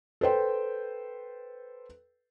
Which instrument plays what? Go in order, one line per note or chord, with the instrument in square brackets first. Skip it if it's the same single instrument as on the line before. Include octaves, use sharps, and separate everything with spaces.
[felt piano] A4 B4 C5 G5